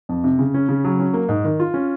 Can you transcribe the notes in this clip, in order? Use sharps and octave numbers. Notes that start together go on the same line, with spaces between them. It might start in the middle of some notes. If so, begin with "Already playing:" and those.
F2
C3
C#3
C#4
C#3
F#3
C#4
A#3
G#2
D#3
F4
C#4